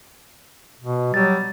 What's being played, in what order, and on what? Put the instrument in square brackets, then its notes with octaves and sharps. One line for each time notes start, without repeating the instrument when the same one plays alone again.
[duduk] B2
[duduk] F#3 [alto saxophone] G3 [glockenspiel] A6